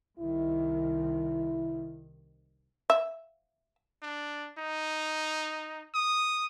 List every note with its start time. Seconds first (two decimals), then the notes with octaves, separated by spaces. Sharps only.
0.19 C2 C3 D#3 E4
2.90 E5
4.03 D4
4.59 D#4
5.95 D#6